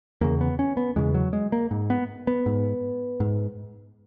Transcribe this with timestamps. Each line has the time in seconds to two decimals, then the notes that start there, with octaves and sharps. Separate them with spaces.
0.21 E2 C#3 A#3
0.41 B3
0.59 C#4
0.77 B3
0.96 E2 C#3 G#3
1.14 F#3
1.33 G#3
1.52 A#3
1.71 G#2
1.90 B3
2.27 B3
2.46 G#2
3.20 G#2